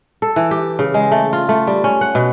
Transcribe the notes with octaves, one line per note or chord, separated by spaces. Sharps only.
A4
E3
G4
C#3
G#3
A3
F4
A3
G3
C#4
F#5
B2